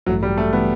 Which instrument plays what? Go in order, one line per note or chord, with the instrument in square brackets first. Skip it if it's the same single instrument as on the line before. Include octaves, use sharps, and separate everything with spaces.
[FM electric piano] A1 G2 E3 A3 [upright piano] F#3
[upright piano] G3
A3
[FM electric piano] E3 A3 [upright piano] B3